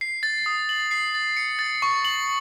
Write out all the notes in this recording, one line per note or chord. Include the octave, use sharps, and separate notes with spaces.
C7
A6
D#6
F#7
C7
A6
C#7
A6
C#6
F#7